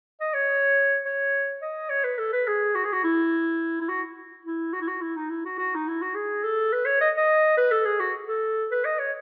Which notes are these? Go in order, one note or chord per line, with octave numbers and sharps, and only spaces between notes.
D#5
C#5
C#5
D#5
C#5
B4
A4
B4
G#4
F#4
G#4
F#4
E4
E4
F#4
E4
F#4
E4
F#4
E4
D#4
E4
F#4
F#4
D#4
E4
F#4
G#4
A4
B4
C#5
D#5
D#5
B4
A4
G#4
F#4
A4
B4
D#5
C#5